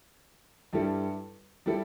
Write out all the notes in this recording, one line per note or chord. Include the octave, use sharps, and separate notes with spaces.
G2 G3 E4 A4
G3 E4 A4